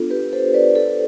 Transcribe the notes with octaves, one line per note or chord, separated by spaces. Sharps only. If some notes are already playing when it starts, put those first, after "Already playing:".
Already playing: B3 D4 F4 A4
G4 B4
A4 C5
B4 D5
A4